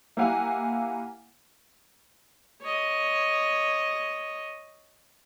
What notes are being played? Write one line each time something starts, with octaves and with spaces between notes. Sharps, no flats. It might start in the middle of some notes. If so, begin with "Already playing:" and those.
A#3 E4 G4 F5 F#5 G#5
C#5 D#5